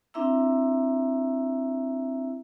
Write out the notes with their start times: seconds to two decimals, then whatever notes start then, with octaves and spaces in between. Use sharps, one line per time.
0.14 C4 D4 E4 E5 A#5 E6